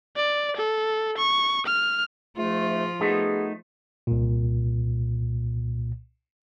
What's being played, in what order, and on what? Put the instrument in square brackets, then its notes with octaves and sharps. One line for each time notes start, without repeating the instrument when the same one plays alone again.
[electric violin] D5
A4
C#6
F6
[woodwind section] G#2 A3 [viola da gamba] F3 F4
[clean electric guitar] A3 D#4 [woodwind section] B3 F#4 G#4
[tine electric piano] C2 A#2